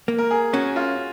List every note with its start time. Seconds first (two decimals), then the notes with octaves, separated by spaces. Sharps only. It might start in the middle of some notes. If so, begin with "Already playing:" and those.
0.08 A#3
0.18 A#4
0.31 G#4
0.53 C#4 F#4
0.76 F4